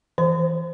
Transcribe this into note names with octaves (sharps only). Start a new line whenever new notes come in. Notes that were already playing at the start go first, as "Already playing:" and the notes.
E3 C5